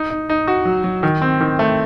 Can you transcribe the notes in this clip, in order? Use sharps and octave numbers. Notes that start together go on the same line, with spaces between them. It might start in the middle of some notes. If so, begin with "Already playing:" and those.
Already playing: D#4
D#4
D#4
F#4
F#3
F#3
D#3
C4
D#3
A3